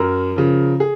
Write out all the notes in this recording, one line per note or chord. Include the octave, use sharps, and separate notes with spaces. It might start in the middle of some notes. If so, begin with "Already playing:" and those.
Already playing: F#2 A#4
C#3 F3
G#4